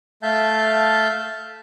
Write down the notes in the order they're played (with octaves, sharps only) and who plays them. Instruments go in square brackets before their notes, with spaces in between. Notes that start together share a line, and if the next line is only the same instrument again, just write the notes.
[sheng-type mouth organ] A3 E5 F5 A5 G6